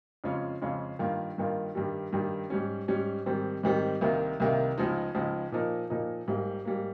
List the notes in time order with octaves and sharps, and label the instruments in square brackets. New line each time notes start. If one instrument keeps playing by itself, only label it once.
[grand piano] F2 C#3 G#3 C#4 F4
F2 C#3 G#3 C#4 F4
G2 D#3 A#3 F4
G2 D#3 A#3 F4
G2 D#3 G3
G2 D#3 G3
G#2 G3 C#4
G#2 G3 C#4
G#2 D#3 G3 C4
G#2 D#3 G3 C4
C2 C3 D#3 A#3
C2 C3 D#3 A#3
C#2 C#3 F3 G#3 D#4
C#2 C#3 F3 G#3 D#4
A#2 F3 A#3 D#4
A#2 F3 A#3 D#4
A#1 G#2 G3 A#3
G#2 G3 A#3